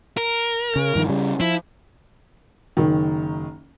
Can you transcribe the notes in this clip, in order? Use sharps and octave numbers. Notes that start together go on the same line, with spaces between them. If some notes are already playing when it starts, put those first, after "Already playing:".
A#4
C#3
G2 D#3 F3
C#3 G3
F3 E4
F#1 D#3